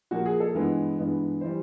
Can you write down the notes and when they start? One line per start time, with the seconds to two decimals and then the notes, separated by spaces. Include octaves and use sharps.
0.11 A#2 F3 A#3 F#4
0.26 G#4
0.40 A4
0.55 G2 E3 G#3 B3
0.99 G2 E3 G#3 B3
1.41 E3 G3 C5